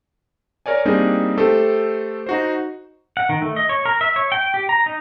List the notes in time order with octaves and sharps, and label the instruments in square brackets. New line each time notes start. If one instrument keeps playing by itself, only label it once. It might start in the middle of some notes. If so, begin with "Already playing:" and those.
[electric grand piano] A#4 C#5 D5 G#5
G3 A#3 C4 D4 D#4 G#4
A3 G4 A4 C5
D#4 F#4 C5
[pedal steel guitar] F#5
D#3
A3
D#5
C#5
A#4
E5
C#5
G5
G4
A#5
D#4